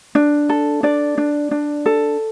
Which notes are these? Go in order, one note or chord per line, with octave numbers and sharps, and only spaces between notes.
D4
A4
D4 D5
D4
D4
A4